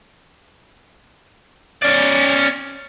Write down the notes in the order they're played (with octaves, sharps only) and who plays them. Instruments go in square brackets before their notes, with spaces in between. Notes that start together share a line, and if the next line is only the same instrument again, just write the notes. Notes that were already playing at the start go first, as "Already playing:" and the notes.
[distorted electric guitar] C#4 D5